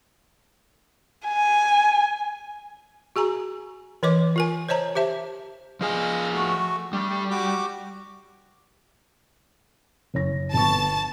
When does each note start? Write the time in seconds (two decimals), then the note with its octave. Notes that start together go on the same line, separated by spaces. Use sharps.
1.27 G#5
3.16 F#4 G#4 G#5 A#5
4.03 E3 A#4 C#5 D#5 D6
4.36 F4 A#4 G#5
4.69 C5 C#5 D#5 A5 A#5
4.95 G4 C5 E5 A5
5.81 F3 G#4 D#5 F5 G#5
6.34 A3 F#4
6.93 G3 A3 D4
7.31 F#4 G4 D6
10.14 F#1 C#5 A#6
10.53 G1 B3 A5 C#6